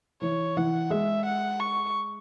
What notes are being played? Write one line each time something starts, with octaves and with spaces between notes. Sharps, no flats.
E3 C#5
E3 F#5
G#3 E5
F#5
C#6